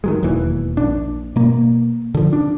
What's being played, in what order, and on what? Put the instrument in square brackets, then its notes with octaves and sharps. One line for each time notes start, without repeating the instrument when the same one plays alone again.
[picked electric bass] D#3 F#3 G#3
E1 D#2 E3
A#1 D4
B2 A#3
D3 F3
D4